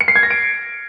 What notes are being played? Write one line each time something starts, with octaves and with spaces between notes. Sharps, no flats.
C#7
C7
G#6
A#6
D7